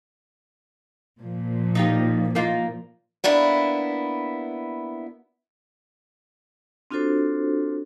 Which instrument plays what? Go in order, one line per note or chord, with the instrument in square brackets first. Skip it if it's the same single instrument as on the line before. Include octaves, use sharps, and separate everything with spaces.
[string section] A#2 F3
[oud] D#4 F4 G4
A#3 D#4 F4
[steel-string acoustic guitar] A#3 B3 D4 E4
[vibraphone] C4 D4 F4 F#4 A4 C5